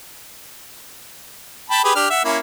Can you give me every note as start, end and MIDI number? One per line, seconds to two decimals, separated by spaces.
1.70 1.84 79
1.70 1.84 81
1.70 1.84 83
1.84 1.95 67
1.84 1.95 68
1.84 1.95 71
1.95 2.07 62
1.95 2.07 67
1.95 2.07 89
2.10 2.20 76
2.10 2.20 78
2.24 2.38 58
2.24 2.38 61
2.24 2.38 64